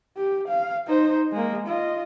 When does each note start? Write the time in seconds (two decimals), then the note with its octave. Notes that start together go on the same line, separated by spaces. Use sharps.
0.17 G4
0.48 F5
0.87 D#4 C5
1.32 G#3 A#3
1.68 F4 D#5